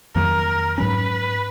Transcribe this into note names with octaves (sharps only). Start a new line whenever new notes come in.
F2 D#3 F#3 A#3 A#4
G#2 F#3 C#4 B4